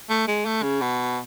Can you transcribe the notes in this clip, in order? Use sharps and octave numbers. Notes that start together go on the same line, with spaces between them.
A3
G#3
A3
C#3
B2